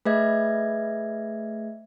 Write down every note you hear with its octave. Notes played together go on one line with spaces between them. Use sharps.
A3 G#4 B4 D#5 E5 G#6